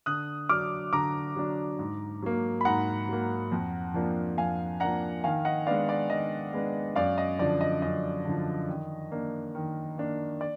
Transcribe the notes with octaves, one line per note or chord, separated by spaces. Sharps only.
D3 D#6 F#6
F#3 D4 D6 F6
D3 A#5 D6
F#3 D4
G#2
F#3 A#3
B5
G#2 F#5 A#5
F#3 A#3
F2
F3 A#3 D4
F2 F5 G#5
F3 A#3 D4 F#5 A#5
D#3 F5 G#5
D#5 F#5
G#3 B3 D4 D5 F5
D5
D#3 D#5
G#3 B3 D4
F#2 D5 F5
D#5
D3 F3 D5
D#5
F#2 D#5
D3 F3
D#3
A#3 D4
D#3
A#3 D4
D5